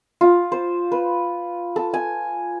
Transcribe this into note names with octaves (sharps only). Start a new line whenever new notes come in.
F4
C5
B4
A4
G#5